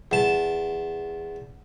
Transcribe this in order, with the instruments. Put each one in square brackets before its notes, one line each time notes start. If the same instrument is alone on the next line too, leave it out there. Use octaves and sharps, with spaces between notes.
[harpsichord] E2 A5